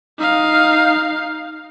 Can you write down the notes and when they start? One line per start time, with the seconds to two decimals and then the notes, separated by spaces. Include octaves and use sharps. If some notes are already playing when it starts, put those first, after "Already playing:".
0.19 D#4 F5